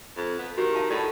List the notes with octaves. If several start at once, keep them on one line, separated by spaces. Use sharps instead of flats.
F2
B3
D#3 F#4 G4
E5 F5 A5
A2 D5 A5 B5